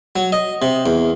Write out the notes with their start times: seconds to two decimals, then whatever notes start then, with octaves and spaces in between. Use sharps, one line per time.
0.16 F#3
0.32 D#5
0.62 C3
0.86 E2